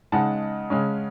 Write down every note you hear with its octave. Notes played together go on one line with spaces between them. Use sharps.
C#3 G#3 D#4 F#5 A5
C#3 G#3 C#4